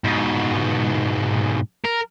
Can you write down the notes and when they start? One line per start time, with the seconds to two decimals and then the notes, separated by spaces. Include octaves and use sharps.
0.04 G#2 B2
1.84 A#4